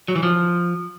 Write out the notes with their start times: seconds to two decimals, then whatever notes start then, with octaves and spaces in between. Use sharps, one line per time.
0.08 F#3
0.16 E3
0.23 F3